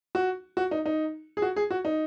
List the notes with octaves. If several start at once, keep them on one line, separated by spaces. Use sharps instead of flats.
F#4
F#4
D#4
D#4
G#4
F#4
G#4
F#4
D#4